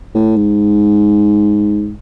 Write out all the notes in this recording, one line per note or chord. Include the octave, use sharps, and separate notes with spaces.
A2
G#2